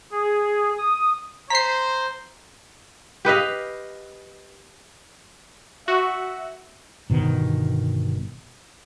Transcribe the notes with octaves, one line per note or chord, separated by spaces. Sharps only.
G#4
D#6
C5 A#5 B6 C7
G4 B4 D#5 F5
F#4 E5
G1 B2 D#3